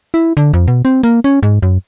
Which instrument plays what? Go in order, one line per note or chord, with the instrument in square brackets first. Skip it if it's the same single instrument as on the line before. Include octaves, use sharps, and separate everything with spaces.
[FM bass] E4
D3
F2
B2
C4
A#3
C#4
G#2
F#2